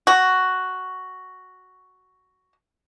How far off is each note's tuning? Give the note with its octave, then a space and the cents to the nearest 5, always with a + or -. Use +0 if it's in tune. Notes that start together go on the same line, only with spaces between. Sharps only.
F#4 +5